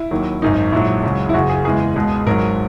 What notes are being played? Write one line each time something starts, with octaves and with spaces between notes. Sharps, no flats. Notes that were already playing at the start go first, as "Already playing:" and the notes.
Already playing: E4
D#2 D#3 F#3
G#1 F#2 D#3 D#4
A#1 G#2 F#3 E4
C#2 C#3 F#3
E4
F#1 F#2 C#3 F#4
G#4
E2 C#3 E3 G#3 G#4
C#2 B2 G#3
G#1 G#2 F#3 A#4